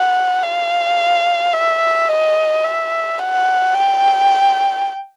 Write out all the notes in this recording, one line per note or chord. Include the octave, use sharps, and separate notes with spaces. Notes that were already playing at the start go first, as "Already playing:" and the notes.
Already playing: F#5
F5
E5
D#5
E5
F#5
G5